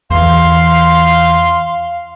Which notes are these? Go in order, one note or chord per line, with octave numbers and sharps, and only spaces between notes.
E2 E3 F5 C6